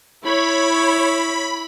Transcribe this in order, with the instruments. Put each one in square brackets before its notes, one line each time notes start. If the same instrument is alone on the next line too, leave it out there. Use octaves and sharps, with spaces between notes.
[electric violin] E4 [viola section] C#5 [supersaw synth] B5